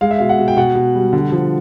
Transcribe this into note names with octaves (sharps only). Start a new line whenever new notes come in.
G#3 F5
E5
B2 F5
F#5
B2
G5
B2 F#5
B2
G3
D3
F3